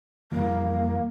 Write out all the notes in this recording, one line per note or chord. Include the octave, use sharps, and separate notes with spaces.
F2 E3 G3 A#3